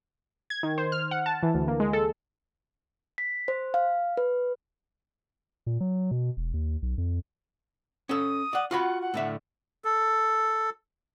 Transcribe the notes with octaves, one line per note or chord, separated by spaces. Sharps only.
G#6
D#3
C5
F6
F#5
A5
E3
D2
A#3
G#3
A4
B6
C5
F5
B4
A#2
F#3
B2
E1
D#2
B1
F2
C#4 A4 D#6
D5 F#5
F4 F#4 F#5 B5
F#5
A2 D3 E5
A4